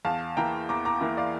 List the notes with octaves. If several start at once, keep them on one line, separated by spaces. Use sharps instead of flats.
E2 F5 A5
E3 A#3 E4 G5 A#5
E2 A#5 D6
A#5 D6
E3 A#3 E4
D5 F5